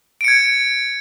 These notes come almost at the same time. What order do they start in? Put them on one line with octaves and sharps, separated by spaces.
D7 C#7 G#6